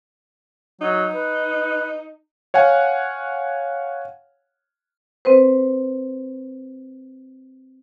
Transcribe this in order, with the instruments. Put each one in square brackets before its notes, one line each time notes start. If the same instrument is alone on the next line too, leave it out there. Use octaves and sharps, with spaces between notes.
[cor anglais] F#3 [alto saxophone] D#4
[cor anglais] B4
[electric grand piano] C#5 F5 F#5 G#5
[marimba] C4 B4 C5